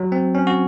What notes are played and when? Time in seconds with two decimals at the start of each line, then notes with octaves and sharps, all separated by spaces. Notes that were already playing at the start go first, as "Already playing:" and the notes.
Already playing: F#3
0.12 C4
0.35 C#4
0.47 F#4